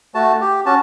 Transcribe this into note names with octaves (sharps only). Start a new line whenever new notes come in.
A3 F#4 A5
G4
C#4 F#4 A5